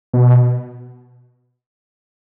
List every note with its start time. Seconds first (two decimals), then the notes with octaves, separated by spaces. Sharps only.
0.14 B2